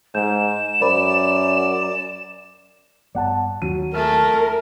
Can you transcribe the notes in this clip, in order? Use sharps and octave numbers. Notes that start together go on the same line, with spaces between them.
G#2 G6 E7
F#2 A#4 C5 D5 B5
G1 B3 D5 F#5 A5
D#2 F#3 D#7
A3 G#4 A#4 F6